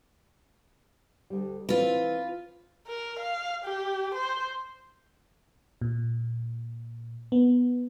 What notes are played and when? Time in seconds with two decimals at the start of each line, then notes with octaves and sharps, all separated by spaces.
1.30 D2 G3
1.69 E3 C4 F4 B4
2.87 A#4
3.19 F5
3.65 G4
4.15 C5
5.81 A#2
7.32 B3